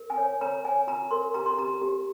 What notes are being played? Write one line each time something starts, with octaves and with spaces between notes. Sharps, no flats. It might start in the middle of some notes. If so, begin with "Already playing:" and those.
Already playing: A#4
G#5
C#5
C#5 A#5
C#5 G#5
F4 A#5
A#4 C6
G4 A#5
C6
G4 A#5
G4